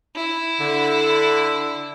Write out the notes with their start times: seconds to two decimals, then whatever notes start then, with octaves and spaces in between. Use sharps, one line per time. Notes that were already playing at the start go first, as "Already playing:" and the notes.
0.16 E4
0.61 D3